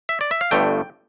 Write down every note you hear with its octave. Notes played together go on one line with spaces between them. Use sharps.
E5
D5
E5
F5
G1 G2 D3 A3 G5